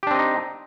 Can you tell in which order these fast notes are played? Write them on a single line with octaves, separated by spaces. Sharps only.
G4 D4 C4 D#5 D#4